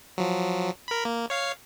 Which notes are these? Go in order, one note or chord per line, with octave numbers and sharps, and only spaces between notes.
F3 F#3
A#4 B5
A#3
C#5 F5 C7